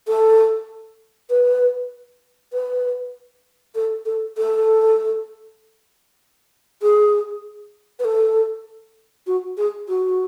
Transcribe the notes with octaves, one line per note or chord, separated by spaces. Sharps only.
A4
B4
B4
A4
A4
A4
G#4
B4
A4
F#4
G#4
F#4